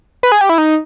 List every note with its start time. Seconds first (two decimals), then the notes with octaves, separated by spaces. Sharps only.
0.23 B4
0.32 G#4
0.41 G4
0.49 E4
0.58 D#4